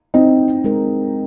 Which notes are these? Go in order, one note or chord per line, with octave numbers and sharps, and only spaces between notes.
C4 D#4
G#3 C4 D#4 A#4